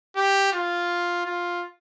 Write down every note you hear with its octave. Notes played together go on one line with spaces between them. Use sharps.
G4
F4
F4